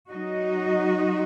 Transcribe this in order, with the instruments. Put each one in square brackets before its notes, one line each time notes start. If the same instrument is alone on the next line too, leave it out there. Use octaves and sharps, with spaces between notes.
[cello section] F#3 D#4 F#4 D#5